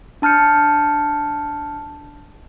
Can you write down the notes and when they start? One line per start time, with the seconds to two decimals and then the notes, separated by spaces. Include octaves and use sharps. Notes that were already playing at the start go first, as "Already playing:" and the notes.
0.22 D4 A5 F6 G6 C#7